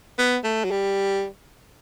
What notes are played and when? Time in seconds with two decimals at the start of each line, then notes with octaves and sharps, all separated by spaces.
0.19 B3
0.44 A3
0.64 F#3
0.71 G3